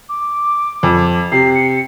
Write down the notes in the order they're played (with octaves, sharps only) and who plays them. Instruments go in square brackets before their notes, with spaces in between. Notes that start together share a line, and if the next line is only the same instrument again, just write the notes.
[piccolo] D6
[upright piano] F2
[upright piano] C3 [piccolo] C7
[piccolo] C#7